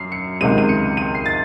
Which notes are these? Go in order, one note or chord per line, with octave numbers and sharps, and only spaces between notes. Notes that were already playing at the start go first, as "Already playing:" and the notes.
Already playing: F#2 C7
C#7
C#2 C3 D#3 G#3 D#7
D#7
C#7
D#7
C7
A6